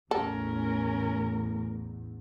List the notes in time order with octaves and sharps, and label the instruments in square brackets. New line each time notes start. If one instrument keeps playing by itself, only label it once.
[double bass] A1 E2 [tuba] A3 [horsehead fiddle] C#4 A#4 [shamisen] A4